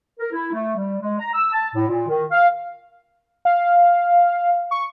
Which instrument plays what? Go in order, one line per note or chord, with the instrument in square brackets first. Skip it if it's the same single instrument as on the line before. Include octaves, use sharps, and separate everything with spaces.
[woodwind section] A#4
E4
A3
G3
G#3
A#5
E6
A5
A2
A#2
D#3
F5
[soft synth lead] F5
C#6